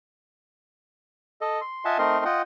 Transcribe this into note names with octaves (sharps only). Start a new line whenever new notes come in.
A4 D#5
C6
F4 D#5 E5 F#5 G#5 A5
A3 C4 D#4 A#4 D#5 C6
F4 D#5 F#5 G5